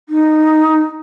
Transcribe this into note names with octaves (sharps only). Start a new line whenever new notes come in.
D#4